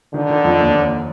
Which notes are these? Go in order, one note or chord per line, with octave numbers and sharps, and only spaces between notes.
D3 D#3
D#3
F2
D#2
D#2